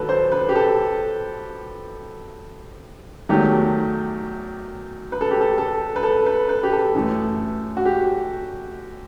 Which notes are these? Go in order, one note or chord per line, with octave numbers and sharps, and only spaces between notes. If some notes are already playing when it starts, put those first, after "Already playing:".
Already playing: D#2 D#3 F#3 A4 B4
C5
B4
G4
A4
E2 D#3 F#3 A3 G4
B4
A4
G4
A4
A4
B4
A4
B4
B4
G4
A4
F#2 E3 A3
F#4
G4